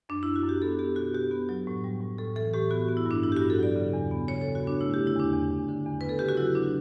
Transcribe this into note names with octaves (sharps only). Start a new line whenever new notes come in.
F#2 D4
E4
F#2
F#4
F#2 G4
B3 A4
B3 G4
B2 F#4
B2 G4
B3
F#3
A2
G3
A2
A2 A4
E3 A4
A2 G4
B3 F#4
B3
E4
G2 D4
G2 E4
G4
F#4
G2
A4
F#3 D5
C#3
E2
B3
C#3 C#5
A4
E2
F#4
B3 D4
A3 E4
G4
D3
E4
E2 D4
E2
E2
D3
E2
B3 B4
A4
C#3 G4
F#4
F#3 E4
D4